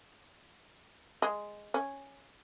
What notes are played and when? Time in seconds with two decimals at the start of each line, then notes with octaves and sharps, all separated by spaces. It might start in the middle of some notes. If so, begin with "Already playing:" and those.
1.22 G#3
1.74 C#4